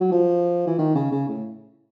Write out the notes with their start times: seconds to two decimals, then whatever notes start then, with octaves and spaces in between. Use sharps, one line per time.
0.01 F#3
0.12 F3
0.67 E3
0.78 D#3
0.95 C#3
1.12 C#3
1.28 A2